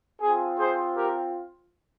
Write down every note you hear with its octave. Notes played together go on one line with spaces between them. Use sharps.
C4 F4 G#4
G#4 C5
G4 A#4